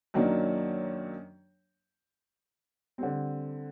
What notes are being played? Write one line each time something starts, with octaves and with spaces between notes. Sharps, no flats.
F#2 D#3 F#3 A#3 D4
D3 G3 C4